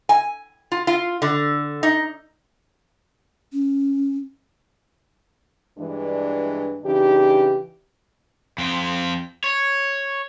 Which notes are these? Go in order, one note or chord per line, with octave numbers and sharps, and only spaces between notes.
G#5
F4
F4
D3
D#4
C#4
G2 E3 G#3 D4
C#3 E3 D4 D#4 G4
F2 C4
C#5